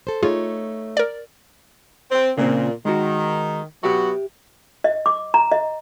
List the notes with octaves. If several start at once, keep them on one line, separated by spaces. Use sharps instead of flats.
A4 C5
A3 D#4 F4 G#4 C#5
A#4 D5
C4
A#2 C#3 A#3 C4
D#3 G#3 F#4
F#3 B3 F#4 G4 E5
D#5
D6
A#5
D#5